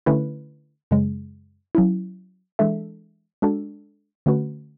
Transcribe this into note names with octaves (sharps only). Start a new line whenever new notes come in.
D3 A3 C#4 E4 B4
F#2 C#3 G#3
F#3 C#4 E4
E3 G#3 D4 A4 E5
G#3 D4 F#4 A4
D3 A3 C#4 F#4 B4